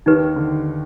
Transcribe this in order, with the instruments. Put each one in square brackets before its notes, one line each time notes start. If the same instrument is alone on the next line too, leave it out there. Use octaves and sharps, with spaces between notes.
[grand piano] D#2 D#3 [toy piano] D#4 G4 B4
[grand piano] D3